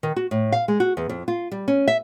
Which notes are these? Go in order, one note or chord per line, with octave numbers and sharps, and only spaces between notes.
D#3
F#4
A2
F5
G#3
F#4
E2
F2
F4
G3
C#4
E5